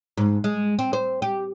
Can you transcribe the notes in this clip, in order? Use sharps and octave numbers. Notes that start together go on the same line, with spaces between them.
G#2
G#3
C4
C5
G4